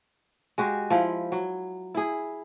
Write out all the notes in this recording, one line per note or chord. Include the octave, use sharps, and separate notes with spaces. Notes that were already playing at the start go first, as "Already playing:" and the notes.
G#3 F#4 G4
F3 E4 F4
F#3
E4 G#4